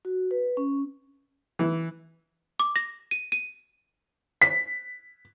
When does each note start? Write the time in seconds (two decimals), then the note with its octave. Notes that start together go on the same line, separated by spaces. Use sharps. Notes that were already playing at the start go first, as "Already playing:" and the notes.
0.05 F#4
0.31 B4
0.57 C#4
1.59 E3
2.60 D6
2.76 A#6
3.11 D#7
3.32 D#7
4.42 B6